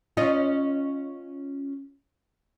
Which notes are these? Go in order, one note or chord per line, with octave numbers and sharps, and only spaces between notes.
C#4 F4 D#5